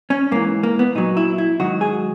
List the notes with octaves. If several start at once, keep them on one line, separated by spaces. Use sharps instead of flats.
C#4
G#2 E3 A#3
A#3
B3
A#2 F#3 D#4
E4
E4
G#2 D#3 F#3 F#4
G#4